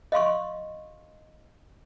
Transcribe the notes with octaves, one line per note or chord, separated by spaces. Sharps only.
D#5 F5 C6 C#6